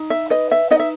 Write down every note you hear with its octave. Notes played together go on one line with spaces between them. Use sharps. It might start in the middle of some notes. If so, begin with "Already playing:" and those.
Already playing: D#4
E5
B4 D#5
E5
D#4 D#5
E5